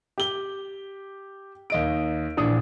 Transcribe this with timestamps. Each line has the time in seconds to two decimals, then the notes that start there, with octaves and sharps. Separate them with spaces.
0.18 G4 G7
1.70 D#2 D#5 D7
2.37 A#1 E3 D4 D#6